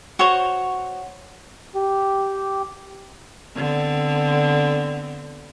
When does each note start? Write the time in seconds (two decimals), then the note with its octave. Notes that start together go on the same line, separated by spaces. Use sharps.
0.19 F#4 C5 C#5 C#6
1.75 G4
3.55 D3 B3 C4